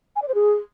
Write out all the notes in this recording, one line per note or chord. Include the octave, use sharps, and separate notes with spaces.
G#5
D5
C5
G#4